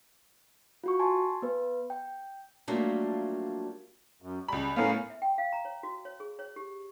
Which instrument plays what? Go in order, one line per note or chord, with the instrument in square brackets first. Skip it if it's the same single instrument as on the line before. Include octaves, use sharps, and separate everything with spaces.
[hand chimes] F4 F#4 C#6
G#5 A5 C6
B3 B4
G5
[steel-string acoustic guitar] F#3 G3 A3 A#3 D4 F4
[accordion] F#2
[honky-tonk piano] C#2 B5 [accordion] G3
[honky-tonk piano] A2 B3 [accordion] C#4 A#4 F5
[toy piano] E5
G5
F5
A#5
C#5
F#4
C#5
G#4
C#5
G4